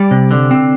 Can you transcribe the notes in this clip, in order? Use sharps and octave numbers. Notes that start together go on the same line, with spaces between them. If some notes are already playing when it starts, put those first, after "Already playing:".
Already playing: G3 D5
C3
D3
C4